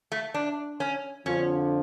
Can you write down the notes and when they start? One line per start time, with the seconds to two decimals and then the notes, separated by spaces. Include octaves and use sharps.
0.12 A3
0.34 D4
0.80 C#4
1.26 F2 D3 F3 C#4